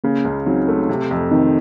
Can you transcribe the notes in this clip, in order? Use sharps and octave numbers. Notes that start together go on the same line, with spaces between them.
C#3 A#3 C#4
C#2
F#3 C4 D#4
A3
C3
F2
D#3 C4 D#4